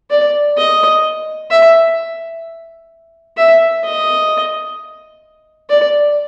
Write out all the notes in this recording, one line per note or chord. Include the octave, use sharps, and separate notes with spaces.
D5
D#5
E5
E5
D#5
D5